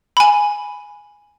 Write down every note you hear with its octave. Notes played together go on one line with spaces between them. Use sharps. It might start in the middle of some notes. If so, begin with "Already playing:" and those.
G#5 B5